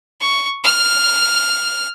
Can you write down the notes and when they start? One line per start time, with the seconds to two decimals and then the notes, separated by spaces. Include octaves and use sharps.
0.21 C#6
0.64 F6